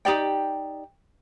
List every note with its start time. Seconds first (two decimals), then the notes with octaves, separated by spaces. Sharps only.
0.05 D#4 G4 D5 G5